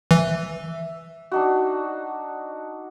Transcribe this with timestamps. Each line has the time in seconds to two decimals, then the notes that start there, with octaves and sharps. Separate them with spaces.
0.11 E3 E5
1.31 D4 D#4 F#4